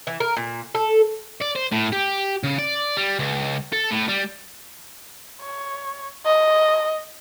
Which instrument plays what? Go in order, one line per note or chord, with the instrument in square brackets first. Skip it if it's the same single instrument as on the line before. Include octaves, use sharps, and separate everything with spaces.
[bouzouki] E3
A#4
A#2
A4
[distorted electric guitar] D5
C5
A2
G4
C#3
D5
G3
C#2
A4
A2
G3
[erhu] C#5
D#5